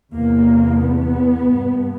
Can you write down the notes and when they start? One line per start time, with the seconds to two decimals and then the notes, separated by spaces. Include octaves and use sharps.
0.13 E2 C3 A#3
0.82 B3
1.51 G2